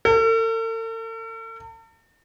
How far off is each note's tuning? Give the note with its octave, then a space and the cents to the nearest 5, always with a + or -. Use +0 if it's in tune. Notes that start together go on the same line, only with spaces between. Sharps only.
A4 +45